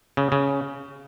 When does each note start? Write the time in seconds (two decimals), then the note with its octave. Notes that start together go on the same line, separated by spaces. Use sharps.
0.17 C#3
0.32 C#3